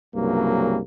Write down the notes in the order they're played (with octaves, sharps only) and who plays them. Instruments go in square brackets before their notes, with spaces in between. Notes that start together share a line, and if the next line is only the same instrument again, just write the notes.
[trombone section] C2 G2 C#3 F#3 A#3